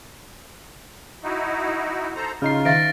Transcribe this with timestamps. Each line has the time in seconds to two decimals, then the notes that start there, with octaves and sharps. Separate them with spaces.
1.23 D#4 E4 F#4
2.16 A4 C5 A#5
2.42 C#3 D#4 F4 F6 C7
2.65 D#3 E5 F5 A6 A#6 D7